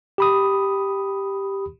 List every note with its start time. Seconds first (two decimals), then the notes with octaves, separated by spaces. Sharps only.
0.18 G4 B5 D#6